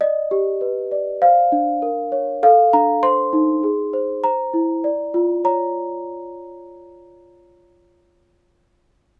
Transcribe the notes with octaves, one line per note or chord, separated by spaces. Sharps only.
D5 D#5
G4
B4
D5
C5 F5
D4
A#4
C#5
A4 F5
D4 A#5
C5 C6
D#4
G#4
C5
C5 A#5
E4
D5
F4
C#5 A#5